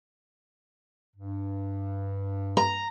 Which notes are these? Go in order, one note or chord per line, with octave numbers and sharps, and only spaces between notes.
G2
A#5